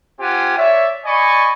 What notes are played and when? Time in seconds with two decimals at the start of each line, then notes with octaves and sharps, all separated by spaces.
0.20 C4 F4 G4 F#5 G#5
0.57 C#5 D5 E5
1.05 D5 D#5 G#5 B5 C#6